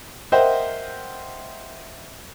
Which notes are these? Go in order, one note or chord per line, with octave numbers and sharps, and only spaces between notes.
A#4 C5 D#5 E5 F#5 G5